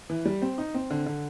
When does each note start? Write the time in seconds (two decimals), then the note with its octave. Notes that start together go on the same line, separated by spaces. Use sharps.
0.10 E3
0.25 G3
0.42 C4
0.58 D#4
0.74 C4
0.90 D3
1.06 D3